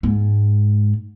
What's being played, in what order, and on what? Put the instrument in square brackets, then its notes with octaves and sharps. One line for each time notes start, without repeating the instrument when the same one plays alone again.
[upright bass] G#2